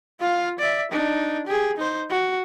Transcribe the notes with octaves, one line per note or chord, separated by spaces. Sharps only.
F4 F5
D5 E5
D4 D#4
G4 G#4
D#4 C5
F#4